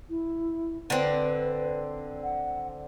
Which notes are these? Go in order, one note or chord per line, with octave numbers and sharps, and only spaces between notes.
E4
D3 C4 B4
F#5